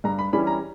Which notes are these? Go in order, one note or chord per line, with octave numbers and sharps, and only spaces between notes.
G2 A#5
B5
E3 G3 C#4 E4 B5
A#5